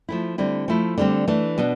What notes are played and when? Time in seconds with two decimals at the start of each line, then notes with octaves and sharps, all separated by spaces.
0.09 F3 A3 E4
0.38 D3 G3 C4 E4
0.68 F3 A3 E4
0.98 D3 G3 C4
1.28 E3 A3 D4
1.58 B2 B3 D4